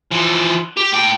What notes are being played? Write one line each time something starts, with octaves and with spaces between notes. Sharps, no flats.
E3 F3
G4
A2 G5